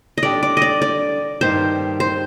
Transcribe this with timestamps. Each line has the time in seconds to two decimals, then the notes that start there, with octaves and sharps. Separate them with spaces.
0.18 D#5
0.23 D3 G3 D4 G4 D5
0.43 D5
0.57 D5 D#5
0.82 D5
1.41 G2 D#3 G3 A#3 D#4 C5
2.00 C5